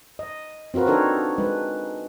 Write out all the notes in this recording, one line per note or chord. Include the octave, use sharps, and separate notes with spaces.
D#5
C4 F4 F#4 A#4 B4
D4 D#4 A4 A#4 C#5
G#3 B4